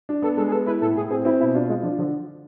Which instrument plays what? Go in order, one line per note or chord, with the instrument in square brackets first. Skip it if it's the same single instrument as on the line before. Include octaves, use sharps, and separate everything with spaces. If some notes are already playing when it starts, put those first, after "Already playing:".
[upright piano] D4
[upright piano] B3 [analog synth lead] A4
[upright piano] G#3 [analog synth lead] A4
[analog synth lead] G#4
[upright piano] B3 [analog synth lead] A4
[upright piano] E4 [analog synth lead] B4
[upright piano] A2 [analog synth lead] A4
[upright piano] A2 [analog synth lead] G#4
[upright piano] C4 [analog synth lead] G#4
[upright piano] C4 [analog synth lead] E4
[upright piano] B2 [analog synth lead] E4
[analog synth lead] D4 [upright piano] F4
[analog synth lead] G#3 [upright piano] F4
[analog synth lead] F3 [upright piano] D4
[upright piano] D3 [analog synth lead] F3